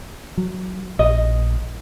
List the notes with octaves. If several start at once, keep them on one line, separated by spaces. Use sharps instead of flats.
F#3
A#1 D#5